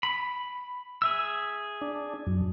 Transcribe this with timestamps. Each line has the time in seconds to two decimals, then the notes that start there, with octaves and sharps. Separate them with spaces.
0.03 B5
1.02 G#4 E5 E6
1.81 D4
2.27 F#2